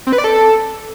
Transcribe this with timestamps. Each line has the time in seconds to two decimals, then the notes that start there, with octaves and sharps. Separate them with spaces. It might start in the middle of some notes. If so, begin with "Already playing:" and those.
0.07 C4
0.13 B4
0.18 D5
0.24 A4